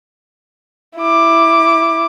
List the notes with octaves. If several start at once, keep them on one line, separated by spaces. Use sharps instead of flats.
E4 D6